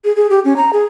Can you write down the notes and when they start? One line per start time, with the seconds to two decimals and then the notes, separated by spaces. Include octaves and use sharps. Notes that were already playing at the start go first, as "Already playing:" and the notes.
0.05 G#4
0.16 G#4
0.30 G4
0.45 C#4
0.57 A#5
0.73 G#4